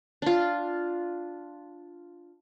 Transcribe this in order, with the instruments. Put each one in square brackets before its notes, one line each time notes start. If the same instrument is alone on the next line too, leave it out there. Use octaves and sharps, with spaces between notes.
[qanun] D4 F4